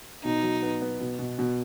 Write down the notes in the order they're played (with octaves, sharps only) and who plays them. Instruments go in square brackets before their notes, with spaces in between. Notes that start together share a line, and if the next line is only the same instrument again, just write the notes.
[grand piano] B2 [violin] D#4
[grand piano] F#3
B3
B3
B2
B2
B2